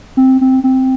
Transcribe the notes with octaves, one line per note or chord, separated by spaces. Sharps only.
C4
C4
C4